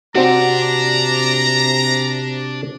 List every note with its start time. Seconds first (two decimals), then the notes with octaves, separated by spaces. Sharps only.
0.15 C3 C4 D4 F#4 D5 A#5